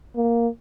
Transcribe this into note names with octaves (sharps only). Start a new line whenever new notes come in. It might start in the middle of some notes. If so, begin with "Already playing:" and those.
A#3